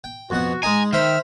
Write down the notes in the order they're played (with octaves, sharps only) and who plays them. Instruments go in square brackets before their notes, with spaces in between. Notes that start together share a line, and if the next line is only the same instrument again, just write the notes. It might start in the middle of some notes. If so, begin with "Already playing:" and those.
[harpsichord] G5
[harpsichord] F2 B2 F#5 [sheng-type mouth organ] F#4
[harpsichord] G#3 D#4 [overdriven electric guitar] G#5 [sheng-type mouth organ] A#5
[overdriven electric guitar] D#3 [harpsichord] C5 G5 B5 [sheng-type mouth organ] E5 F6